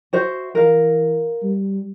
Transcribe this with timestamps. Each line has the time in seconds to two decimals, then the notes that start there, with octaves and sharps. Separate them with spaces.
0.13 F#4 C5 E5
0.55 E3 A#4 F5
1.42 G3